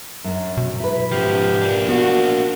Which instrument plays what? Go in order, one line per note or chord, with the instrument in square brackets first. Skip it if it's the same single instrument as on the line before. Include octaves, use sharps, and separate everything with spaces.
[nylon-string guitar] F#2 D4
[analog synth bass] B2
[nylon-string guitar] E4 B4
[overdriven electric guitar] G#2 F3 [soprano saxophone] G4
[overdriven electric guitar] A#3 D4
[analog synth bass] B3 [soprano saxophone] F#4